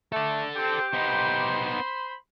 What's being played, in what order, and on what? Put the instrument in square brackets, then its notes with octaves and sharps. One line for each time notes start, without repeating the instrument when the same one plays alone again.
[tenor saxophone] A3 [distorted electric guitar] A4 D5
[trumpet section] C4 [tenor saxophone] G4
[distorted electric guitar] B3 D#4 [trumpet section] C5 B5 C6